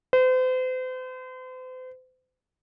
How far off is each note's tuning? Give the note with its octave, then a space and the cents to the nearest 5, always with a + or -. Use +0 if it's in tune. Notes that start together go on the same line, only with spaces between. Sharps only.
C5 -40